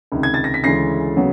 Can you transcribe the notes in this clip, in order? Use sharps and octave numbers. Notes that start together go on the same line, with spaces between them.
C#2 C3 D#3
G#6
A6
A#6
B6
D2 C#3 E3 G#3 A#6 C7
C#3 F#3 B3